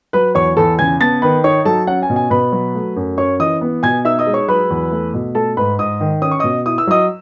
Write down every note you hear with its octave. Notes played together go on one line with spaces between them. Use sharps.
F#3 B4 B5
E2 C#5 C#6
E2 A4 A5
C#3 G#5 G#6
B3 A5 A6
D#3 B4 B5
D#4 C#5 C#6
F#3 A4 A5
C#4 F#5
G#5
B2
G#5
B2 B4 B5
F#3
A3
F#2
C#4 C#5 C#6
E3 D#5 D#6
B3
B2 G#5 G#6
D#4 E5 E6
D#5 D#6
G#3
C#5 C#6
F#3 B4 B5
E2
A3
B2
A3 A4 A5
G#2 B4 B5
G#2 D#5 D#6
D#3
C#4 D#6
C#6
B2 D#5 D#6
E4 D#6
E6
F#3 D#5 D#6